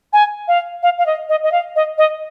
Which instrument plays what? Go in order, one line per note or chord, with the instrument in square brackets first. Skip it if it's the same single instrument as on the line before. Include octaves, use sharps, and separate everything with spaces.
[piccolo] G#5
F5
F5
F5
D#5
D#5
D#5
F5
D#5
D#5